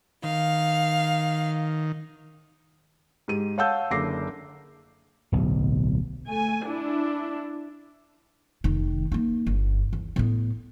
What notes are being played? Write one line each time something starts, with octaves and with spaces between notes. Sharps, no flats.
D#3 F5
G#2 G4 D#7
C#5 F5 F#5 A5 E6 G6
F#1 D3 D6 E6 A#6 C7
D1 B1
A3 G#5
D4 E4
F1 D#3
A#3 D#4
G1
E2
A2 B3